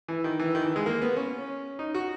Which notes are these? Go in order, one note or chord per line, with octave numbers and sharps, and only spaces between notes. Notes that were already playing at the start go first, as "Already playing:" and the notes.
E3
D#3
E3
D#3
E3
G#3
A#3
B3
C#4
D#4
F#4